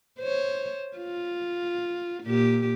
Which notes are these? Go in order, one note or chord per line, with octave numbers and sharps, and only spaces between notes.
C5 C#5
F4
A#2 G4